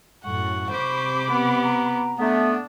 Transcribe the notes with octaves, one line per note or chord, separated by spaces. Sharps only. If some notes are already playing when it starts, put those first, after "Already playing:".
F#2 A2 F#5 C#6
C3 C5 B5 D6
B3
A#5
A3 B3 D4